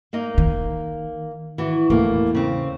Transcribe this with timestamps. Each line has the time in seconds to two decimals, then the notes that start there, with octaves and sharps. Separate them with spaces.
0.13 A#3 D#4 D#5
0.38 D#3
1.58 E3 F#4
1.90 E2 A2 A#3
2.35 C#3 C4